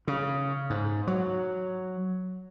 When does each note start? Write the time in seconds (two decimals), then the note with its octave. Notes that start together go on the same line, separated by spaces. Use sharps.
0.07 C#3
0.70 G#2
1.07 F#3